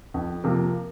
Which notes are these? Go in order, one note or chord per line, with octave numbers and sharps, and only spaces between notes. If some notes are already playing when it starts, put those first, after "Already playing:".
F2
C3 F3 A#3